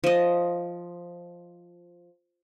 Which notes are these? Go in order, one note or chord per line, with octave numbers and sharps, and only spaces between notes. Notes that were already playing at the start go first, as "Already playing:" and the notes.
F3 D#5